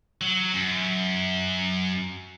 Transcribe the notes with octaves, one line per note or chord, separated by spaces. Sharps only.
F#3
F#2